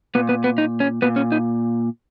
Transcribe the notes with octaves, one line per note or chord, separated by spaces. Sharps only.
A#2 B3
B3
B3
D#4
C#4
A#2 B3
C#4
D#4